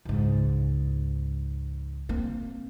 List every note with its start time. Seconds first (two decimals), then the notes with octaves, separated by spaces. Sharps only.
0.05 C#2 G#2
2.09 A#3 C4